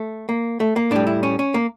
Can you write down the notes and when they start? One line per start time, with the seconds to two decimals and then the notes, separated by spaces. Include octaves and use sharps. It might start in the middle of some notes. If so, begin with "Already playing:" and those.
Already playing: A3
0.29 A#3
0.60 A3
0.76 A#3
0.91 A2 G3 D4
1.07 E4
1.23 C#4
1.39 C#4
1.54 A#3